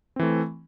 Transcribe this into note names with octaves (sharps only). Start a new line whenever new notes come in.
E3 A3 C4